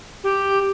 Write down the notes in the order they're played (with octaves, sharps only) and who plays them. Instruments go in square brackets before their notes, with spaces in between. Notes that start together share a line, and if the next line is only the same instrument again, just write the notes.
[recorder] G4